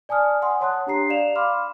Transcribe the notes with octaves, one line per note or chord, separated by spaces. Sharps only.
D5 G#5 A5 D#6 F6
F#5 G#5 C6 D#6
C#5 F#5 A5 C6 D#6 F#6
D4 G4 A#5 C7
D5 F5 E7 F7
F5 B5 C6 D6 F6